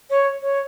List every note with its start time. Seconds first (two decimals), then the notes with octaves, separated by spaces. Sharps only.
0.10 C#5
0.42 C#5